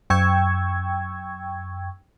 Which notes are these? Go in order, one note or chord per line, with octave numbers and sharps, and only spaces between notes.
F#2 G5 C#6 E6 G#6